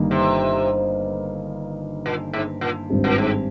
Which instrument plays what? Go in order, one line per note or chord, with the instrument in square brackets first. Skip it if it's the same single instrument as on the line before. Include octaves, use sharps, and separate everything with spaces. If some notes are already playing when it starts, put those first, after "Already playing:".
Already playing: [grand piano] G1 G2 D#3 A#3 D#4
[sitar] C3
A#2
G#2
A#2
[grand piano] G#1 G2 G3 C4 G4
[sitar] A#2
G#2